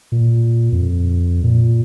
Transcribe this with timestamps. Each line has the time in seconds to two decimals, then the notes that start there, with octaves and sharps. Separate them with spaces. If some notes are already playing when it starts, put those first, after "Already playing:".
0.12 A#2
0.72 F2
1.43 A#2